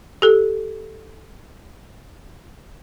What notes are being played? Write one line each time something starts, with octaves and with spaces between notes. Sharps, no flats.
G4 A4